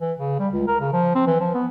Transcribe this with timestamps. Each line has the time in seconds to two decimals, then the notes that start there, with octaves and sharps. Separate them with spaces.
0.01 E3
0.19 C#3
0.39 G3
0.53 C#2
0.67 A#4
0.80 C#3
0.93 F3
1.15 C4
1.27 E3
1.40 F3
1.54 B3